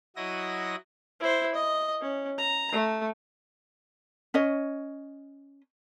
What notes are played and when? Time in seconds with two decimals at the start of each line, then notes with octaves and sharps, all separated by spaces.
0.16 F#3 E4 F#4 D#5 D#6 A#6
1.20 E4 C5
1.54 D#5
2.01 C#4
2.38 A#5
2.72 A3
4.34 C#4 C#5 D#5